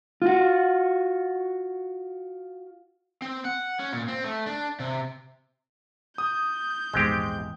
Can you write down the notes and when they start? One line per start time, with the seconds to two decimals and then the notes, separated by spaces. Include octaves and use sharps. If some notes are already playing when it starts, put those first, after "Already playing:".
0.22 F4 F#4
3.22 C4
3.45 F#5
3.79 C#4
3.93 A#2
4.08 C4
4.24 A3
4.46 D4
4.80 C3
6.18 D#6 G6
6.94 A#1 E2 G#2 G#3 C4 G4